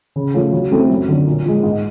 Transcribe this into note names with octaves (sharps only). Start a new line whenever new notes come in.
C#3
F3 A3 C#4 F4
F#3
A3 C4 E4 A4
F#2
D3 F#3
A#2
F3 G#3
G#2